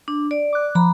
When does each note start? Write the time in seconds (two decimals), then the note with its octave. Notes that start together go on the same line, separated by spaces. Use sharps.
0.08 D4
0.31 D5
0.53 D6 F#6
0.75 F3 A#5 B5